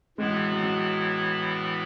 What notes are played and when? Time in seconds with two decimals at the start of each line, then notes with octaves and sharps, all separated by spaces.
0.18 A2 E3 G#3 B3 E4
0.30 F#3
0.52 F#3
0.63 F#3